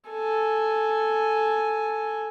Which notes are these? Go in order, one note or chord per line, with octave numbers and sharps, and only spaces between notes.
A4 G#5